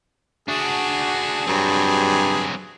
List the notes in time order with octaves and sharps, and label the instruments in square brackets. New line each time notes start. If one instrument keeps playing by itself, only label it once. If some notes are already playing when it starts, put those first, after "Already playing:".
[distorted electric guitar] D4 F#4 [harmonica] G#4
[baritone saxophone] G2 [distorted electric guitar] F#3 C4